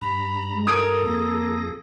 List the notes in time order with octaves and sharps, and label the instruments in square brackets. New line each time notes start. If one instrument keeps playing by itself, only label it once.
[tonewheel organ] G2 A#5 [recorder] B5
[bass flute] G#3
[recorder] A4 [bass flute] A#4 [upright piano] D#6 G#6 D7
[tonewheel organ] F2 G#4 A#6 [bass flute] A#3